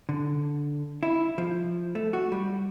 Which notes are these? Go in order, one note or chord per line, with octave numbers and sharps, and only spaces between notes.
D3
E4
F3
A3
F#4
G3